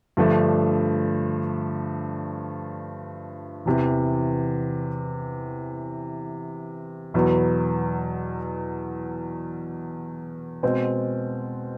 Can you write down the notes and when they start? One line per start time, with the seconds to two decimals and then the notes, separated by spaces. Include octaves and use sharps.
0.17 G2 D3 F3 A3 D4
3.65 E2 C3 E3
7.14 E2 B2 F#3 B3
10.63 B2 G#3 C4